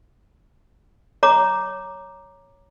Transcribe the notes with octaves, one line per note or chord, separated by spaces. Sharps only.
C#5 A#5 D6